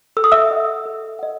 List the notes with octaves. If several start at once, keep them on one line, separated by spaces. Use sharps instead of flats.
A4 E6
D#6
E5 E6
D#5 F#5
A4
D#5 F#5